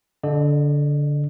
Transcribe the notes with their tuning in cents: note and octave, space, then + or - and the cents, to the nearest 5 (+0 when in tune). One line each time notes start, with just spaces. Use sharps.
D3 -20 D#5 -45